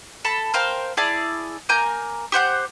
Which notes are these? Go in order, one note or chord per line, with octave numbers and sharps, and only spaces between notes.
A4 A5 B5
A#4 C5 F5 G5
E4 G#4 D5 A5
A#3 G#5 A#5 G6
G4 C5 F#5 G6